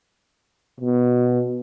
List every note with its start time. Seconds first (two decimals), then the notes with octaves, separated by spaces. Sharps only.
0.80 B2